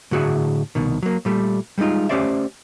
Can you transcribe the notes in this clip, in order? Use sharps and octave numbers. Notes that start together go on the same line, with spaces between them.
A2 D3 F#4 G#4 E5 F#5
C2 B2 D#3
F#3 A#3
A#2 G3 A3
G3 G#3 C#4 D#4 F4
A3 C#4 G4 C5 D5 E5